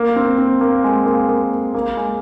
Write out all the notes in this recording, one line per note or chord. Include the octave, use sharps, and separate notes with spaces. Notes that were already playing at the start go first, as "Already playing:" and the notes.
Already playing: A#3
C4
C4
A#3
G#3
A#3
A#3
A#3
G#3